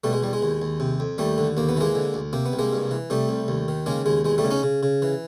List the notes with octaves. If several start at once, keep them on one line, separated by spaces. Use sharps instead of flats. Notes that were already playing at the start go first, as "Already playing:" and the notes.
B2 G3 A3
G#3
E2 G3
G#3
D#2
D#2
C3
F2
D#2 G3 A3
D3
D#2 A#3
B3
E3 G#3 A#3
D3
D2
C3 A#3
B3
C2
G#3 A#3
G2
E3
C3 G3 A3
C2
D#2
D#3
C#3 G#3 A#3
D#2 G#3
E2 G#3
G3 A3
C#3
C#4 D#4
C#3
C#3
E3